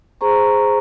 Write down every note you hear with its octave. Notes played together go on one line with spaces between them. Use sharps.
G#4 C5 A#5 C#6